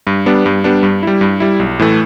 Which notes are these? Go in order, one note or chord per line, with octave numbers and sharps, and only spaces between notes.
G2
G3 B3 D4
G2
G3 B3 D4
G2
G3 E4
G2
G3 E4
B1
A2 E3 A3